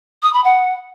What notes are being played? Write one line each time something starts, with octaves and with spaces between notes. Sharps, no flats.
D#6
B5
F#5